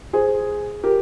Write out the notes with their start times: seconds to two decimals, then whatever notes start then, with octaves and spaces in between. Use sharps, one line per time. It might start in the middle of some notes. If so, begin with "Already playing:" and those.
0.13 G#4 C5
0.83 G4 A#4